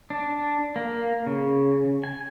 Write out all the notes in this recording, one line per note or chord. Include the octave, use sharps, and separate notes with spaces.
D4
A#3
C#3
G#5